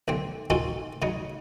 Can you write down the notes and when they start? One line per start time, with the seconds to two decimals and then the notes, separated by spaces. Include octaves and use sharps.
0.08 B1 D3 C4
0.50 C4 D#4 F4 F#4 G#4 A4
1.02 C#3 F#3 D#4